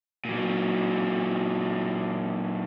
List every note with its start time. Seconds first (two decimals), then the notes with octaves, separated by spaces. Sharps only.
0.25 A#2 F#3